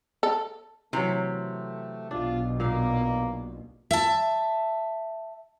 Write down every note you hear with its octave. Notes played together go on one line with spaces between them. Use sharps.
A4
C3 E3 F#3 A3
B1 B2 D4 F4
A#2 A#3 F5
E5 A5